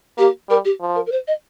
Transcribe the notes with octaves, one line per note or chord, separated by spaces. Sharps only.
A#3 G4
G3 A#4
G4
F3
A#4
A#4
C5
D#5